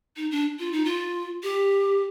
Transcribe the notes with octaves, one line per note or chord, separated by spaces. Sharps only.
D#4
D4
F4
D#4
F4
G4